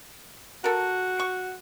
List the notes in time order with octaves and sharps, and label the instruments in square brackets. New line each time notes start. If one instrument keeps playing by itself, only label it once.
[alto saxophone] F#4 [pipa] A4 A#4
[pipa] C#6